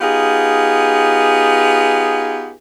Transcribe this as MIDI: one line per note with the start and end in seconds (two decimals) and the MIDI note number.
0.01 2.53 59
0.01 2.53 63
0.01 2.53 65
0.01 2.53 67
0.01 2.53 68